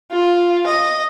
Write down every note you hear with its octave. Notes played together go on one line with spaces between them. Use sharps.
F4
D#5